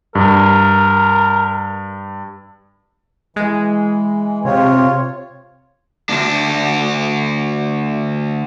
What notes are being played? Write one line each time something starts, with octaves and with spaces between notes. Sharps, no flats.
G2 A#4
E3 G#3
C3 F4 C#5
D2 D4